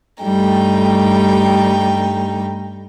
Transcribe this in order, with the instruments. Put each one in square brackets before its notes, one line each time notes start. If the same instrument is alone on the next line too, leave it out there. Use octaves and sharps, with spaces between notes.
[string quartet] G2 G3 A3 D#4 G5